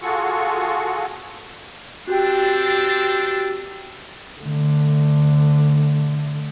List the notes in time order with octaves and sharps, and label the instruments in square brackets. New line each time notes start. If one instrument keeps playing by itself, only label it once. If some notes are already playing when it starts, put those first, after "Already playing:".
[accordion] F4 F#4 G#4 A4 C#6
[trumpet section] C4 D4 A4 [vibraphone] F#4 G4 G5
[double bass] D3 A3